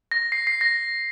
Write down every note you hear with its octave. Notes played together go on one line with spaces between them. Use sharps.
A#6
C7
C7
A#6